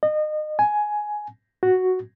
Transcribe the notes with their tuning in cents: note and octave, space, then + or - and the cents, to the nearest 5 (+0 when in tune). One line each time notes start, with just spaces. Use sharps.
D#5 -30
G#5 +10
F#4 +0